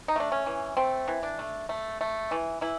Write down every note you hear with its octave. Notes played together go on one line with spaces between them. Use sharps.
D#4
A3 D4
C#4
E3
A3 C4
E3
D4
A3
A3
A3
E3
E3 E4